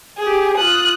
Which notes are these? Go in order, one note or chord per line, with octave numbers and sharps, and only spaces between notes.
G4 G#4
F4 D#6 F#6